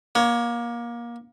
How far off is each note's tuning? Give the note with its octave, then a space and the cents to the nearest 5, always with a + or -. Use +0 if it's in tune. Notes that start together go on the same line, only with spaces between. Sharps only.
A#3 +25 C#5 +20